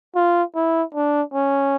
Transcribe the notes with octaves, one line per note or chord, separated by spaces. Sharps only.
F4
E4
D4
C#4